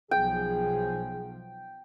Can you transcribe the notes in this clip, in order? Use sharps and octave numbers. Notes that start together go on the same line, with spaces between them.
B1 F3 G#4 G5